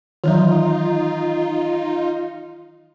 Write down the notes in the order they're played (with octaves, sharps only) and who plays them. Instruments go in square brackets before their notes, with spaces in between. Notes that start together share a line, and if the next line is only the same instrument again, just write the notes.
[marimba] D#3 E3 F#3 [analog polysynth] D#4 F4